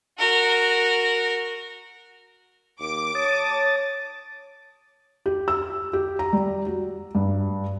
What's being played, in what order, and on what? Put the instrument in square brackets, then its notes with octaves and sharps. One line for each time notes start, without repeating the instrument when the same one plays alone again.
[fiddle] F#4 A#4
[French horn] D#2 [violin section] D6
[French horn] C#5 [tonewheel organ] A5 D#6 A6
[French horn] C#5
[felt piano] G4
E6
G4
A#5
G3
F#4
G2